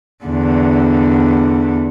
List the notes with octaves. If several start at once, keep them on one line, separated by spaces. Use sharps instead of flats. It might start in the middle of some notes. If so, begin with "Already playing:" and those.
E2 D3